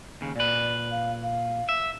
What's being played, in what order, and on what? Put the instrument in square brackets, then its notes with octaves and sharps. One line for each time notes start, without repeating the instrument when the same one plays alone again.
[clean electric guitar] D#2 C#3
[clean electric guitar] A#2 B4 [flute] D5
[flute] F5
F5
[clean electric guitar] E5